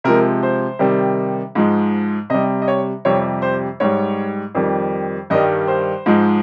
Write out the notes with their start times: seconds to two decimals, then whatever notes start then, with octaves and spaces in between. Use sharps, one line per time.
0.04 C3 F3 G#3 A#4
0.43 C5
0.79 C3 D#3 G3
1.55 G#2 F3 G#3
2.30 C3 G3 D#5
2.62 D#5
2.68 C#5
3.05 F2 C3 G3 C#5
3.42 C5
3.80 G#2 G3 C#5
4.55 F2 D#3 G3
5.30 G2 D#3 G3 D#5
5.68 C5
6.06 G#2 F3 G#3